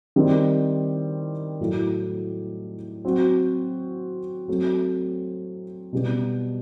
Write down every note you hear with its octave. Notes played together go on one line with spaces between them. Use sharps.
D#3 G3 C4
A2 F#3 A3 E4
F#3 C4 F#4
F#3 A3 C4
B2 G3 B3